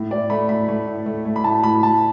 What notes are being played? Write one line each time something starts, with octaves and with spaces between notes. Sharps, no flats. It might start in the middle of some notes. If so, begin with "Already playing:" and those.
Already playing: A2
A2 D5
A3 B5
A2 B5
A3
A2
A3
A3
B5
A2 A5
A2 B5
A2 A5